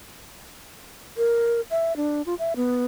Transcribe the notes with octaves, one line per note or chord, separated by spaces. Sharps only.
A#4
E5
D4
F4
E5
B3